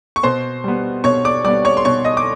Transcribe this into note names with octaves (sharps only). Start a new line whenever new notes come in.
C#6
B2 C5 C6
G3 B3
B2 C#5 C#6
D5 D6
G3 B3 D5 D6
C#5 C#6
C6
B2 C#5 C#6
D#5 D#6
D6